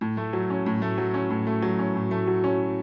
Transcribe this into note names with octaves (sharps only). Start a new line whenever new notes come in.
A2
A3
F#3
C#4
A2
A3
F#3
C#4
A2
A3
F#3
C#4
A2
A3
F#3
C#4